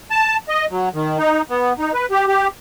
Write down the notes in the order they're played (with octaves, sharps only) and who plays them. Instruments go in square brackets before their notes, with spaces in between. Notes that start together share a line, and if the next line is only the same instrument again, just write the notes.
[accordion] A5
D#5
F#3
D#3
D#4
B3
D#4
B4
G4
G4